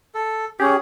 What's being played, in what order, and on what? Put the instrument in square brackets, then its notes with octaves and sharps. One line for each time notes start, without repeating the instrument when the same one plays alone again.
[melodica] A4
[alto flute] C#4 [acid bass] G4 [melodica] G#4